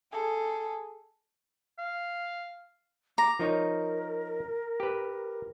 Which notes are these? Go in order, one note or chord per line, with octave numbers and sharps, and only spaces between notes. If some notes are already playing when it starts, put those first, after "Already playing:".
G#4 A4
F5
A#5 D6
F3 D#4 A#4 C#5
G4 B4